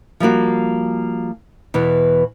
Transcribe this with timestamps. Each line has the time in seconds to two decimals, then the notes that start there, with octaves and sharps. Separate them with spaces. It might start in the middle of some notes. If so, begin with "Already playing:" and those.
0.20 F3 G3 A#3 F#4
1.74 E2 B2 E3